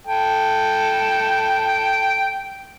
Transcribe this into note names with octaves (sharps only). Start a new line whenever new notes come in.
A4 G5